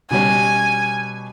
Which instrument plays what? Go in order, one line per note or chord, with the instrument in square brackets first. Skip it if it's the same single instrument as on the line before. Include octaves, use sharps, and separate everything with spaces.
[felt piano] B2 G3 C#4 [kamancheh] G#5